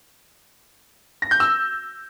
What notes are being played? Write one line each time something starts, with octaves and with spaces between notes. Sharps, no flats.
A#6
G6
E6